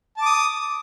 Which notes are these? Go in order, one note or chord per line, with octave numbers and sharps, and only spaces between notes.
A5 D6 D#6